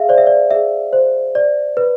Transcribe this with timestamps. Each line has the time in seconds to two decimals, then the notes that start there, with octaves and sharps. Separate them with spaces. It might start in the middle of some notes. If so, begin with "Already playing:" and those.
Already playing: G#4 E5 F5
0.09 C5 D5
0.18 E5
0.27 D5
0.51 G#4 E5
0.93 C5
1.35 D5
1.77 B4